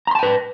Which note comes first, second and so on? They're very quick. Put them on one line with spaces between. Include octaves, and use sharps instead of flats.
A#5 C6 A5 G5 B4